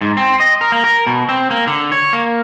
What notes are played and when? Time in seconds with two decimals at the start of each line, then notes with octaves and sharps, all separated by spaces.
0.01 G#2
0.17 C4
0.40 D#5
0.61 A#4
0.72 A#3
0.84 A#4
1.07 B2
1.29 C4
1.50 A#3
1.67 D3
1.92 C#5
2.13 A#3